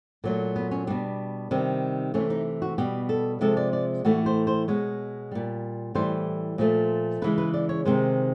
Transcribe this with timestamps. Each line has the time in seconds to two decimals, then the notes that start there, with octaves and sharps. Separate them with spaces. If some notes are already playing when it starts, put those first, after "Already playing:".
0.24 A#2 F#3 A3 A#3
0.56 B3
0.71 C#4
0.87 B2 G3 D4
1.51 C3 D#3 G3
2.14 C3 E3 A3 C#4
2.30 D#4
2.62 F#4
2.78 B2 G3 G4
3.09 A4
3.41 C3 F3 G#3 A4
3.57 D5
3.73 D5
4.05 A2 E3 A3 F#4
4.26 C5
4.47 C5
4.68 B2 G#3 C#5
5.31 A#2 G3
5.95 A2 E3 G3 C5
6.58 A#2 F3 A3
7.22 C#3 E3 G#3 B4
7.38 B4
7.54 D5
7.69 C#5
7.85 C3 D#3 G#3 C5